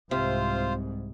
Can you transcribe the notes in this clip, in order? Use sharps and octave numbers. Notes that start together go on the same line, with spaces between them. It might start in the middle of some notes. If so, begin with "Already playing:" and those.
C2 G#2 C3 F4 C5 F5